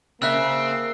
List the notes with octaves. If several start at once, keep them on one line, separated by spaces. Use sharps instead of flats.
C#3 A#3 C4 E5 E6 F#6